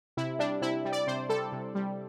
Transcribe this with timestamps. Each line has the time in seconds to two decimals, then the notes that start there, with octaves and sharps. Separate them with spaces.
0.17 C3 E4
0.39 G3 D4
0.61 C3 E4
0.85 G3
0.93 D5
1.07 C3 C5
1.29 G3 A4
1.52 C3
1.75 G3